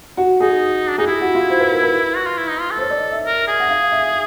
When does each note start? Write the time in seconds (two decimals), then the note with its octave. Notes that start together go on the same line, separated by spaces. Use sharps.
0.17 F#4
0.40 D#4 G#4
0.89 D4
0.98 D#4 G#4
1.06 E4 G4
1.21 F#4
1.35 F4
1.50 C5
1.60 B4
1.71 A#4
1.83 B4
2.16 F#4
2.26 F4
2.38 E4
2.49 D#4
2.60 F4
2.70 A4
2.78 C5
2.81 C#5
2.90 D5
2.97 D#5
3.11 E5
3.25 A#4
3.48 G#4
3.60 F#5
3.69 F5
3.92 E5